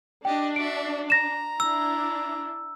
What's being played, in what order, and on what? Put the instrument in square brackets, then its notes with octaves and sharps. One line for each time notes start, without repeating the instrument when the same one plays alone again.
[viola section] D4 [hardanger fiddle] G4 D#5 [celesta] G5
[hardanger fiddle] F#4 E5 [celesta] D7
[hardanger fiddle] A#5 [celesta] A#6 E7
[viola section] D4 E4 [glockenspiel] E6